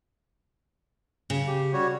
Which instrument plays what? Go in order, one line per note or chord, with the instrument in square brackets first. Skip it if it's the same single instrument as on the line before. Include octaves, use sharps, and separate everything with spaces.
[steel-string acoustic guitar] C#3
[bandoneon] G4
G3 F#4 C#5